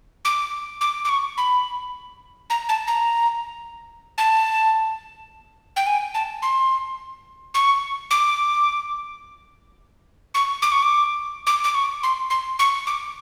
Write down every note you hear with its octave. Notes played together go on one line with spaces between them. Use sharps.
D6
D6
D6
C#6
B5
A#5
A5
A#5
A5
G5
G#5
A5
C6
C#6
D6
C#6
D6
C#6
D6
D6
D6
C#6
C6
C6
C#6
D6